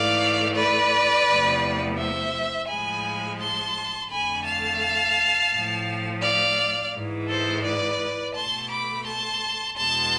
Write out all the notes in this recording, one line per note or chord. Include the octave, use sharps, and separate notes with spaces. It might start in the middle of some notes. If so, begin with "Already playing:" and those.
Already playing: G#2 E3 A3 D5 F5
B4 D5
E2 C3 F3 A3
C5 E5
A2 F3 G#3 G#5 B5
A5 C6
F2 D3 A3 G#5 B5
F5 A5
A2 F3 A3
D5 F5
G#2 E3 G#3
A4 C5
B4 D5
B2 A3 A5 C6
B5 D6
A5 C6
E2 B2 G#3 A5 C6